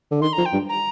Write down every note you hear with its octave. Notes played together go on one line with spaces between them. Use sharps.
D3
D#3 C6
F3 A#5
G5
G2
A#5